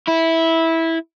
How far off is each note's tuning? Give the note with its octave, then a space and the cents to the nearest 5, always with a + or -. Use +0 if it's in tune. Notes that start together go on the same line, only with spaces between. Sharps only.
E4 -10